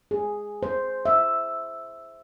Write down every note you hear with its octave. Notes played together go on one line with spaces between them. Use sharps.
G#4
C5
E5